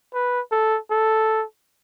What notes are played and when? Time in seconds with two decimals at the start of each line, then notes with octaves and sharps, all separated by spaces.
0.14 B4
0.52 A4
0.91 A4